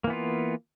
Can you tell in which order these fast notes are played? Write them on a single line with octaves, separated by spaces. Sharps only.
A#3 E3 B3 F4